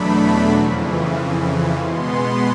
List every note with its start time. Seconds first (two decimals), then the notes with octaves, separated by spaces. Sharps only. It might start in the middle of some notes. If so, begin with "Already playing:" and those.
Already playing: E2 B2 F#3 A3 D4 B5
0.51 F2 C#3 E3
1.77 B2 G#3 B3 C6